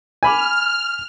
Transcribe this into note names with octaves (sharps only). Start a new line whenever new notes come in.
G#5 B5 D6 F6